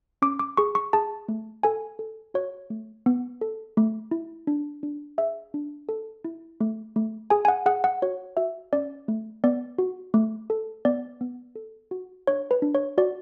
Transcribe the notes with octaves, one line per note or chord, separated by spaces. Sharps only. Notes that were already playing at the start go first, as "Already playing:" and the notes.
C#4 D6
D6
G#4 C#6
C#6
G#4 A5
A3
A4 G#5
A4
F#4 C#5
A3
B3
A4
A3
E4
D4
D4
G#4 E5
D4
A4
E4
A3
A3
G#4 G#5
G#5
F#5
G#4 F#5
F#5
F#4 C#5
F#4 E5
C#4 D5
A3
B3 D5
F#4
A3
A4
B3 D5
B3
A4
F#4
D4 C#5
B4
D4
C#5
F#4 D5